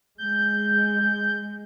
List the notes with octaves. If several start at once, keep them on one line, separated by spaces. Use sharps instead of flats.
G#3 G6